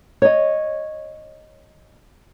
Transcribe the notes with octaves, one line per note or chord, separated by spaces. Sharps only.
C#5 D#5